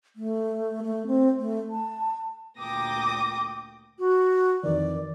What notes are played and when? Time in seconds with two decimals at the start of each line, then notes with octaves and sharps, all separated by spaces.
0.16 A3
0.83 A3
1.07 C4
1.39 A3
1.71 A5
2.59 D2 A#2 G5 D6 D#6 A#6
3.99 F#4
4.63 F2 D#3 E3 D5